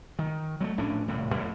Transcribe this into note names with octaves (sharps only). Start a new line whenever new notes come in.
D#3
F#3 G#3 A3
A#1 A2 C#4 D4
D#1 A2 C3
F2 A2